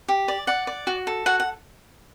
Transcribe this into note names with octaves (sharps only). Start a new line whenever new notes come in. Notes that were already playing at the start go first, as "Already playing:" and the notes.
G4
D5
D5 F#5
D5
F#4
A4
F#4 F#5
F#5